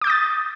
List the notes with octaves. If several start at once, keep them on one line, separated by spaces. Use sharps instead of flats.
D6 D#6 G6 A6